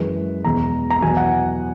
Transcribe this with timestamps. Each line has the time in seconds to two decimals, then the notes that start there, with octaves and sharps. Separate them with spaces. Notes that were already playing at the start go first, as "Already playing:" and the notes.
Already playing: F#2 E3 G#3 B4
0.45 E2 B2 G#3 A#5
0.90 A#5
1.02 E2 B2 F#3 G#5
1.17 F#5